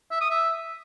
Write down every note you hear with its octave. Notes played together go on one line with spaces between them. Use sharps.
E5
D#6
E5